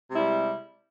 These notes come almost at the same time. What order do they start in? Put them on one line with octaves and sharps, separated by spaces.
C3 G#3 E4 G3